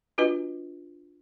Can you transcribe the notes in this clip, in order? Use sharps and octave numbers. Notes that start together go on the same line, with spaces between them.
D4 F4 F#4 B4 D#5